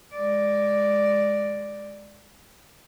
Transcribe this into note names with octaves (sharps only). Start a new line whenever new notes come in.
G#3 D5